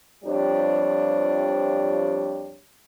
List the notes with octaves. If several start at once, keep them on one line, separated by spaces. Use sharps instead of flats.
F2 F3 G3 D4 G4 C#5